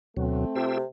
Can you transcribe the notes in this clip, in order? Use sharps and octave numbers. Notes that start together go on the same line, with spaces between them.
D2 B2 F#3 A3 C4
C3 F4 G4 E6